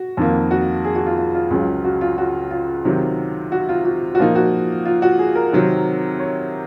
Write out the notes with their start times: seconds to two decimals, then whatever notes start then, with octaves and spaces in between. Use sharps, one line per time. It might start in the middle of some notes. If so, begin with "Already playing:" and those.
Already playing: F#4
0.17 F2 D#3 A#3
0.51 F#4
0.85 G#4
0.95 F#4
1.06 F4
1.18 F4
1.34 F4
1.50 C#2 C#3 F#3
1.85 F#4
2.01 F4
2.18 F#4
2.51 F4
2.85 C3 D#3 F#3
3.52 F#4
3.69 F4
3.85 F#4
4.15 F#4
4.19 A#2 F3 A#3 D#4 F4
4.35 F#4
4.85 F4
5.02 F#4
5.19 G#4
5.36 A#4
5.53 C3 D#3 F#3 C4
6.20 C#5